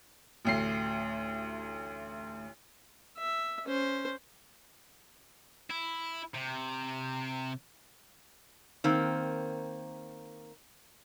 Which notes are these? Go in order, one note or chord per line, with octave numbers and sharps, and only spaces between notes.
A1 D2 C7
E5
C#4 C5
E4
C3
D#3 A#3 C4